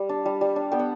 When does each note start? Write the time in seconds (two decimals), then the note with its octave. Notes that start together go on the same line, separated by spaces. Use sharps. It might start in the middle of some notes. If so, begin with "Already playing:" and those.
Already playing: G3
0.09 D4
0.26 G3
0.41 G3
0.56 D4
0.72 B3 G5
0.79 F#5